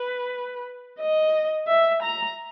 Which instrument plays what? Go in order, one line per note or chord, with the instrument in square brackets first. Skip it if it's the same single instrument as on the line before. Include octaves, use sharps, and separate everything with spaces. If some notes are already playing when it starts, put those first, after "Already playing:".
Already playing: [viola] B4
D#5
E5
A#5